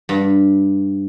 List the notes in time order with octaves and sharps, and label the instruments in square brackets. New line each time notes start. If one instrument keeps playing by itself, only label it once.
[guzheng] G2